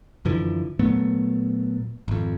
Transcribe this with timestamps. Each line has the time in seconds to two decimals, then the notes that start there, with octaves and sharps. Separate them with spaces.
0.25 F#2 D3 E3 F3
0.79 A#2 F#3 A3 B3
2.08 G#1 F2